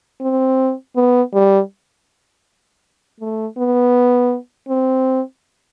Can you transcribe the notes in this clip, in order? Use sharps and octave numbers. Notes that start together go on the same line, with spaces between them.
C4
B3
G3
A3
B3
C4